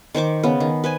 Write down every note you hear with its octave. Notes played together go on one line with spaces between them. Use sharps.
D#3 C5 C#6 D6
C#3 B3
D#3
B4 C5 G#5